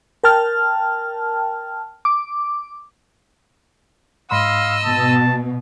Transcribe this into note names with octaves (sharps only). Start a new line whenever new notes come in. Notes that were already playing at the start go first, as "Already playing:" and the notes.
A#4 G5 A5 F6
D6
G#2 D#5 F5 B5 C6 E6
B2 A5